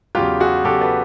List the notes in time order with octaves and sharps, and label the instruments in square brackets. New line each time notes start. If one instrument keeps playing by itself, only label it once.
[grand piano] E2 C#3 F#3 F4 G4
F#4 G#4
E2 C#3 F#3 G4 A4
A4 B4